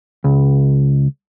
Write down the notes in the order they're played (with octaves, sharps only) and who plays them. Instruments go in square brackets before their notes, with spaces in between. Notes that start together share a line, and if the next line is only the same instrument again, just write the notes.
[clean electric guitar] C#2